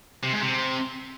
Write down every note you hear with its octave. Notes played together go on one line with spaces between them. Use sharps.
C3
G#2
C3